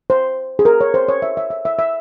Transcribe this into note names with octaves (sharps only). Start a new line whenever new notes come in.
C5
G#4
A#4
C#5
C5
C#5
E5
E5
E5
E5
E5